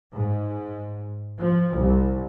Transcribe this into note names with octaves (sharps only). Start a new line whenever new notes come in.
G#2
F3
C2